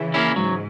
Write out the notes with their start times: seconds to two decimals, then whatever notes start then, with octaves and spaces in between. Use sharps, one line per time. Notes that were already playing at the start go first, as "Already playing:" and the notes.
Already playing: C#3 E3
0.14 A#3 C#4 E4
0.35 G#2 F#3